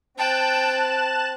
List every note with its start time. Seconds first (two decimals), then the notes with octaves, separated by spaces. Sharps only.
0.18 C4 G5 A5 F#6 E7